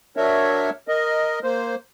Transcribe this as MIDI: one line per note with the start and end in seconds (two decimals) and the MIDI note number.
0.17 0.70 54
0.17 0.70 62
0.17 0.70 70
0.17 0.70 73
0.17 0.70 76
0.88 1.39 70
0.88 1.39 75
1.43 1.75 58
1.43 1.75 72